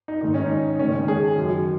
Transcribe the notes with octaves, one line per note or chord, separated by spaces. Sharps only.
D#4
G#2 D#3 D#4
C#4
D#4
G#2 D#3 C#4
C#4
G#4
F#2 D#3